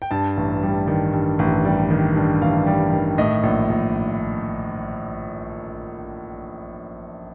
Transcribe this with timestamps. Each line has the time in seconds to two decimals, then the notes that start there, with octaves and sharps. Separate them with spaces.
0.02 G5
0.11 G2 A5
0.37 A1
0.63 G3
0.88 D#3
1.13 G2
1.39 A1
1.65 G3
1.91 D#3
2.16 G2
2.42 A1 F5
2.67 G3
2.93 D#3
3.18 A2 D#5
3.43 A#1
3.69 A#1